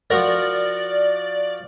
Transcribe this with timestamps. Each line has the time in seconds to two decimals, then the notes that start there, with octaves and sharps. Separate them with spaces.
0.10 F3 F#4 A#4 D5